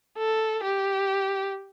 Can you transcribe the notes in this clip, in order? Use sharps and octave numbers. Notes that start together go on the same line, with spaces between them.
A4
G4